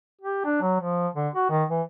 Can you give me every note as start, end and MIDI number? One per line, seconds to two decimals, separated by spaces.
0.21 0.44 67
0.45 0.61 62
0.62 0.79 54
0.80 1.08 53
1.16 1.29 50
1.35 1.47 66
1.50 1.64 51
1.70 1.82 52